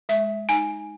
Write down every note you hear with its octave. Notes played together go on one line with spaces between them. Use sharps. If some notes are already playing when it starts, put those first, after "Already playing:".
G#3 E5
D#4 G#5